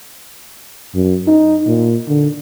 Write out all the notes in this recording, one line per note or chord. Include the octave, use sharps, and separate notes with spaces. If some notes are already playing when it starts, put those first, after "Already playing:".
F#2
D#4
A#2
D3